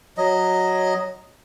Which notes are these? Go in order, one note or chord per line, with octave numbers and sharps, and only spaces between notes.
F#3 D#5